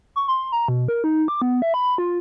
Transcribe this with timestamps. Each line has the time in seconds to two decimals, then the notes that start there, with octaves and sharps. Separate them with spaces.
0.16 C#6
0.28 C6
0.52 A#5
0.68 B2
0.88 A#4
1.04 D#4
1.28 D6
1.42 B3
1.62 E5
1.74 B5
1.98 F4